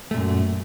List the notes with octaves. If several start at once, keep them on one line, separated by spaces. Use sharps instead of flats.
F#2 A#2 A3